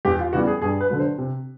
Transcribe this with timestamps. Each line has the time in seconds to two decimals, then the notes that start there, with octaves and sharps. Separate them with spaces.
0.05 E2 G4
0.19 F4
0.33 C#3 E3 G3 B3 F#4
0.47 G#4
0.62 G2 G#4
0.81 B4
0.90 D3 F#3
0.99 C5
1.18 C3